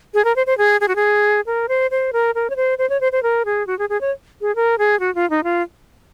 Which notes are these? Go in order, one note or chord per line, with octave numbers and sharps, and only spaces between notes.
G#4
A#4
C5
C5
G#4
G#4
F#4
G#4
A#4
C5
C5
A#4
A#4
C#5
C5
C5
C#5
C5
C5
A#4
G#4
F#4
G#4
G#4
C#5
G#4
A#4
G#4
F#4
F4
D#4
F4